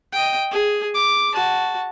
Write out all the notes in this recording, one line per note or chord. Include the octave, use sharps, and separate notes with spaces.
D#5 G5
G#4
D6
F#4 A5